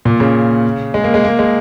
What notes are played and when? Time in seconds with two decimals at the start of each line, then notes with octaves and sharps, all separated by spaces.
0.05 A#2
0.20 C#3
0.94 G#3
1.04 A#3
1.14 G#3
1.25 A#3
1.39 G#3